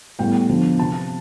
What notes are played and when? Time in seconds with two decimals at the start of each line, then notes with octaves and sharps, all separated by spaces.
0.19 A2 G3 B3 G5
0.49 D3 F3 B3
0.79 C3 F3 C4 A5